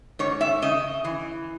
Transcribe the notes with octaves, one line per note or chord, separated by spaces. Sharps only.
G#2 C#5
E5
C#3 D#5
E3